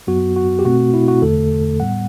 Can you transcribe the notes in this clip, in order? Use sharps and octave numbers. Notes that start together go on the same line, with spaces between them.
F#2 F#3 B3 F#4
F#4
G4
B2 A3 C4 F#4
E4
F#4
E2 D3 A3 A4
A2 G3 B3 F#5